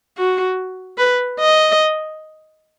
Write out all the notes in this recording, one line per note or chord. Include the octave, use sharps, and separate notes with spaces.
F#4
B4
D#5